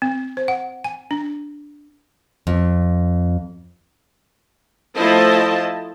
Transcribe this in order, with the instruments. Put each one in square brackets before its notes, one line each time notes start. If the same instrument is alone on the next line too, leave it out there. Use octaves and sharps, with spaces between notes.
[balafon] C4
C5
F#5
G#5
D4
[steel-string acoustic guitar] F2
[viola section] F3 A3 E4 C5 D#5 A5